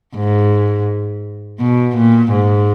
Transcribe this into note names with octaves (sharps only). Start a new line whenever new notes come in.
G#2
B2
A#2
G#2